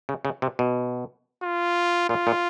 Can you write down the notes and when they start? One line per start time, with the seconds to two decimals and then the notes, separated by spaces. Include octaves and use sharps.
0.09 C#3
0.25 C#3
0.42 C3
0.59 B2
1.43 F4
2.09 A#2 F4
2.27 A#2